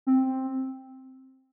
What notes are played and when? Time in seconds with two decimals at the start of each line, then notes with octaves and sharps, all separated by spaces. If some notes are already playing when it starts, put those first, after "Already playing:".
0.07 C4